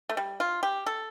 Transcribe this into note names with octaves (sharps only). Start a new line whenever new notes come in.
A3
G3
F4
G4
A4